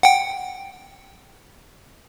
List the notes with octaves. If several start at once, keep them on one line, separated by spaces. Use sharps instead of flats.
F#5 G5